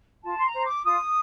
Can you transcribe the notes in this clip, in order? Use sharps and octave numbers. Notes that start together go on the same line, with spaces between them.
F4 A5
C6
A#5
C5
D6
F4 D#6